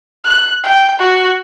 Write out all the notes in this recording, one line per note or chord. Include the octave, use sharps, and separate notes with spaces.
F#6
G5
F#4